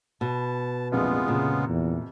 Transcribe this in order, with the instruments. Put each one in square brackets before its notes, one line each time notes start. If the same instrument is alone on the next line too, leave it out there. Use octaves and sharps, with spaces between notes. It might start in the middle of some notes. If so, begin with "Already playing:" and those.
[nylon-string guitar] B2 [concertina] A5
[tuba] A#1 [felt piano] F2 C3 E3 [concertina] G#3 B3 F4
[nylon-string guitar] A#2 [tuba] C#3
[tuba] E2